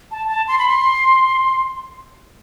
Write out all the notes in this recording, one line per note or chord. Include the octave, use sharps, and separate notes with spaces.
A5
A5
C6
B5
C6